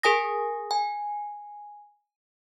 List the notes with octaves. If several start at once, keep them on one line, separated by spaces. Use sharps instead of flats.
G#4 A#4 G#5 D#6 A#6
G#5